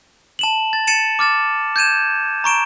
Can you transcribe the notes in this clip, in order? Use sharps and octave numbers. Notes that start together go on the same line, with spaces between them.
A5 E7 F#7
A6
A6 C#7 D#7 E7
D6 F6 A6 E7
G6 G#6 D#7 E7
A#5 C#6 D7 E7